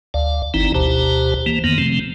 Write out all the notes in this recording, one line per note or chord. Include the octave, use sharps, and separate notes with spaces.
D2 D5 F5
G1 E3 C4 D#4 E4 A#5
D2 B2 G4 C5 A5 A#5
E3 A#3
F2 D#3 A#3 B3
C3 F3 A3 C4